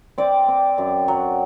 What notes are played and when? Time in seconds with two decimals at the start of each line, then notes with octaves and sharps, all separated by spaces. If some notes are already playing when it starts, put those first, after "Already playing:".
0.18 C4 D5
0.48 C4
0.78 F#2
1.08 F#3